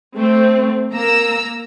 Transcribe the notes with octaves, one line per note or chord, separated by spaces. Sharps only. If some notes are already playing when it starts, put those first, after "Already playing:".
A3 C4
A#3 A#4 A#5 E6